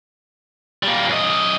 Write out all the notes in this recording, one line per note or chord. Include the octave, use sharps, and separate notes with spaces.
G3 A#3
F#2 D#5